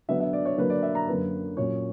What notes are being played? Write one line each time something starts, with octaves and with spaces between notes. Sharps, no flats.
D3 F#3 B3 D4 E5
E5
D5
C#5
D3 F#3 A#3 B4
D5
E5
A#5
F#2 D3 A#3 B4
A#2 F#3 C#4 C#5